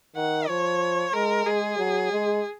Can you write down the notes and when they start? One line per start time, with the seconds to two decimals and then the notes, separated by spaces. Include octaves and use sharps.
0.16 D#3 F#5
0.49 F3 C#5
1.14 G#3 A#4
1.46 G#3 G#4
1.78 F#3
2.11 G#3